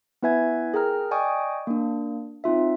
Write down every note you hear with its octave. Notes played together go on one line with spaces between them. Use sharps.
B3 E4 B4 E5 G#5 G#6
G#4 A#4 G5 A#5 F6
D5 D#5 G5 G#5 C#6 D#6
A#3 D4
C4 D#4 F4 E5